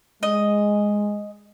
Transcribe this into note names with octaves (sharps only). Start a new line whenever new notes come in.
G#3 D#5